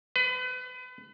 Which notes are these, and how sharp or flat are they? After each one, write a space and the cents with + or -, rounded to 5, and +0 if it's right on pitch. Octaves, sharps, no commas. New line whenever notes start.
B4 +35